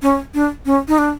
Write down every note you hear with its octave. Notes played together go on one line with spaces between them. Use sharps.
C#4
D4
C#4
D#4
D4